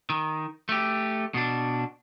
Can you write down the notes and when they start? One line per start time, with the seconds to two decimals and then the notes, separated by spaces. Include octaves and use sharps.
0.10 D#3
0.69 A3 G4
1.34 B2 D4